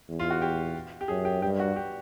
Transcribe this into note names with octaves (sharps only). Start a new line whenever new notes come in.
E2
F4
F#4
G4
G4
F#2 G#4
G4
G2 G4
F#4
G4